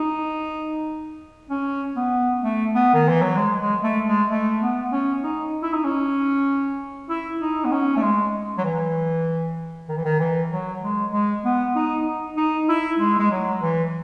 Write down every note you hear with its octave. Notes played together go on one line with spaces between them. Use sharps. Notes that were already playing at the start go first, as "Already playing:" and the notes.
Already playing: D#4
C#4
B3
A3
B3
D#3
E3
F#3
G#3
G#3
A3
G#3
A3
B3
C#4
D#4
E4
D#4
C#4
E4
D#4
B3
C#4
A3
G#3
F#3
E3
D#3
E3
D#3
E3
F#3
G#3
G#3
B3
D#4
D#4
D#4
E4
G#3
G#3
F#3
E3